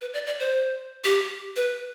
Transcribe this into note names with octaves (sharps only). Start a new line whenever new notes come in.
B4
D5
D5
C5
G4
B4